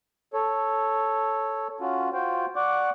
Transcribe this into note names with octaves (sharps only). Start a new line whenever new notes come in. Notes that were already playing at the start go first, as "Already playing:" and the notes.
A4 C#5
C#4 F4 F#4
F4 F#4 C5 G5
D5 F#5 C#6 D6